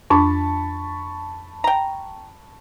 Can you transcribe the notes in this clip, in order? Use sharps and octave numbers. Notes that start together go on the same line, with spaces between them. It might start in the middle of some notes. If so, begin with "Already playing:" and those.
F2 D4 A5 B5 C#6
G5 A#5